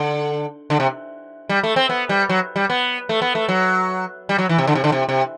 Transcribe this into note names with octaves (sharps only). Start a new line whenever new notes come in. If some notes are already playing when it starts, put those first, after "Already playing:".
Already playing: D3
D3
C3
G3
A3
C4
B3
G3
F#3
G3
B3
A3
B3
A3
F#3
G3
F#3
E3
C3
D3
C3
D3
C3
C3